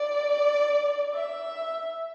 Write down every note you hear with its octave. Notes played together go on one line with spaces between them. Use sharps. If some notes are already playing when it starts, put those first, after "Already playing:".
Already playing: D5
E5